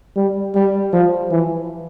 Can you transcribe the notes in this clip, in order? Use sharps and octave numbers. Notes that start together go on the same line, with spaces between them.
G3
G3
F3
E3